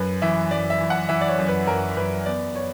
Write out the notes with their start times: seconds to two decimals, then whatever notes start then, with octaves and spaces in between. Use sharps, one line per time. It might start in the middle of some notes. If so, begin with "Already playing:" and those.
Already playing: F#2 B4
0.22 E3 E5
0.51 F#2 D5
0.70 E5
0.81 E3
0.90 F#5
1.09 E3 E5
1.21 D5
1.28 C#5
1.38 F#2
1.48 B4
1.67 F#2 A#4
1.96 F#2 B4
2.26 B3 D5
2.55 C#5